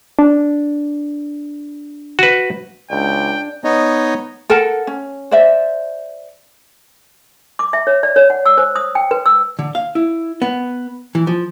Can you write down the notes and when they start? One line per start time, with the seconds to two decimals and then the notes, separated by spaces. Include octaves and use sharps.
0.19 D4
2.19 F#4 B4
2.91 C#2 D4 G5
3.64 B3 D#4 C#5 D#5
4.50 A4 A#4 F#5 A5
4.87 C#4
5.31 C5 D5 E5
7.59 D6
7.73 E5
7.87 C#5
8.03 D5
8.16 C#5
8.30 F#5
8.46 E6
8.58 C5
8.76 D#6
8.95 G5
9.11 B4
9.26 E6
9.59 D3
9.75 F5
9.95 E4
10.42 B3
11.15 E3
11.27 F3